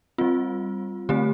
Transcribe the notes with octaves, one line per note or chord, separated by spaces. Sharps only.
G3 C4 F4
D3 A3 C4 G4